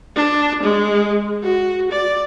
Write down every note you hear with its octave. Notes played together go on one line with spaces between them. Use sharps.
D4
G#3
F#4
D5